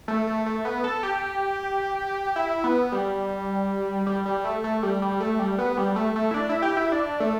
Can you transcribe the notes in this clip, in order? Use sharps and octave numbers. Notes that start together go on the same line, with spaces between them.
A3
A3
A3
B3
A4
G4
E4
B3
G3
G3
G3
A3
A3
G3
G3
A3
G3
B3
G3
A3
A3
E4
D4
E4
G4
E4
D4
A3